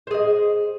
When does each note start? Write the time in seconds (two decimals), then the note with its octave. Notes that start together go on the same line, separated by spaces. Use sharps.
0.07 C5
0.11 G#4
0.14 D#5